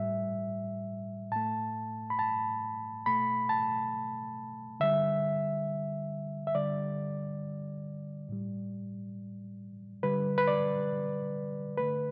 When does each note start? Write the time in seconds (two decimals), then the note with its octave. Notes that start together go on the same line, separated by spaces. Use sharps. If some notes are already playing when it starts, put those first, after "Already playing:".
Already playing: A2 G3 E5
1.32 A2 A3 A5
2.10 B5
2.19 A5
3.06 B2 A3 B5
3.49 A5
4.80 D3 G3 E5
6.47 E5
6.55 D3 G3 D5
8.29 A2 G3
10.03 D3 G3 B4
10.38 B4
10.48 D5
11.77 D3 A3 B4